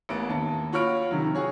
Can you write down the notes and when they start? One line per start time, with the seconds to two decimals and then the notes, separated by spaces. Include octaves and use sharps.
0.09 A1 A#3 B3 D7
0.29 D#2 A5
0.72 F4 F#4 C#5 B5 F6 D7
1.11 C3 D#3 F#3
1.35 F#4 G#4 C#5